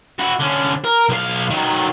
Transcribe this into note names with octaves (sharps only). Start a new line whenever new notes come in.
E4 F#4
D3 C#4
A#4
B1 F5
D#3 F#3